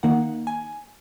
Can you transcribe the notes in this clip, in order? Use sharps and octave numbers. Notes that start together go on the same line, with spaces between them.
D#3 A#3 D#4 F#5
G#5